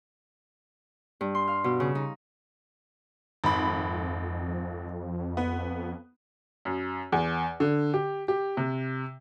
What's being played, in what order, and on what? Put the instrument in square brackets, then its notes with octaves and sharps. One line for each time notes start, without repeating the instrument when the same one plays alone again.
[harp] G2
C6
F5
B2
C#3
D#4
[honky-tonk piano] G#1 B5 [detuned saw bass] F2
[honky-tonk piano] B3
[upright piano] F#2
E2
D3
G4
G4
C3